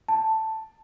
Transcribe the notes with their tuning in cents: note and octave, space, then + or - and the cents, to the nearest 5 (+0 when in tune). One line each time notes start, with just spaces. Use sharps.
A5 +5